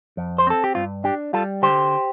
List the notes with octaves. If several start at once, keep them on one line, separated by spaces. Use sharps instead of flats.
F2
C5
C4 A4
G4
G2 F4
D4 G4
G3 F4 A4
D3 G4 C5